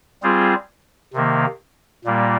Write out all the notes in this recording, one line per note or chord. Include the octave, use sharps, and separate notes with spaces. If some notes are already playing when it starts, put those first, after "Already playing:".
G3 C4 F4 G#4
C3 D#3 A#3
A#2 G3 A#3